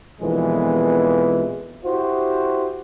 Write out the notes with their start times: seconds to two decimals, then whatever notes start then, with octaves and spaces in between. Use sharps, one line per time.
0.21 A#1 F2 B2 E3 G#3 B3
1.85 E4 F#4 G4 C5